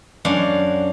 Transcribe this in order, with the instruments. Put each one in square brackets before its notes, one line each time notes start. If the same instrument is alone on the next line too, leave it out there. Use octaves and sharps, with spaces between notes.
[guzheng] F#2 D4 F5 F#5